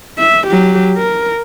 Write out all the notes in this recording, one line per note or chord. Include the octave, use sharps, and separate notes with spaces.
E5
F#3 G4
A#4